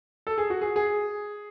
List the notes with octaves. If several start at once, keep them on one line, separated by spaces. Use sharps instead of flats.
A4
G#4
F#4
G#4
G#4